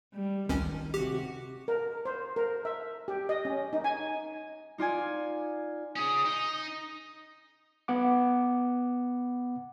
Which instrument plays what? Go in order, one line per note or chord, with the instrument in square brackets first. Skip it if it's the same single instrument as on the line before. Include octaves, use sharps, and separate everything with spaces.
[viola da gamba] G3
[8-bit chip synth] G#1 C#2 C#4 [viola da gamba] D#3
[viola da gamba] C3 F#4 [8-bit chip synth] G4
[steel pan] A#4
C5
A#4
E5
G4
D#5
C#4
D#4
G#5
[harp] D#4 F4 D5 G#5 G#6
[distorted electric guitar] C#4 G#4 [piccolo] D#6
[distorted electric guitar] D#4
[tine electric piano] B3 F#5 D6